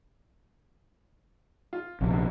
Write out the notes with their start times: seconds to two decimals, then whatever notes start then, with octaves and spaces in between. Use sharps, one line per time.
1.73 F4
2.01 A#1 C3
2.13 D3